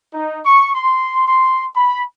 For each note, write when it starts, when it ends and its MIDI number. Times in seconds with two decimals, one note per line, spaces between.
0.13 0.39 63
0.45 0.72 85
0.75 1.26 84
1.27 1.65 84
1.75 2.01 83